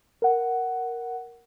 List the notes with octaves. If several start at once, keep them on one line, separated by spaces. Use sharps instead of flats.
A#4 F#5